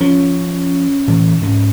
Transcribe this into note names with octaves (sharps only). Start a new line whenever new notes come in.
F3 C#4
A2 E3
G#2 C#4